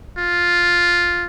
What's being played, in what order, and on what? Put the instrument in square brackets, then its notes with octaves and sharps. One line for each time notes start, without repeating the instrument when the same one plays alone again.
[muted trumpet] F4